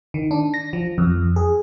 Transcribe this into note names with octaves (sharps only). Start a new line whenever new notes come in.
D#3
D4
A#6
F3
F2
G#4